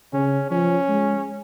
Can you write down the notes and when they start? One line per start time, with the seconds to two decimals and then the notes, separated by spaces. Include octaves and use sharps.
0.13 C#3 C#4
0.51 F3 C#4
0.88 G#3